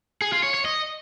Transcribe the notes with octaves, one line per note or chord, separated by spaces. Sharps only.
G#4
F4
C#5
C#5
D#5